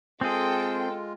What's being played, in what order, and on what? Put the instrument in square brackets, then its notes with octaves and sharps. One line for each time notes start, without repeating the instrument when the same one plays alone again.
[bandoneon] G#3 F4 [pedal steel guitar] C4 G#4 [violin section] A4 G5